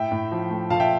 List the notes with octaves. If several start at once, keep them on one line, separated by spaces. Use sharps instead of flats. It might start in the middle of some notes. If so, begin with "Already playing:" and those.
Already playing: A2 E5 G5
A2
F3
A3
A#2 F5 A5
E5 G5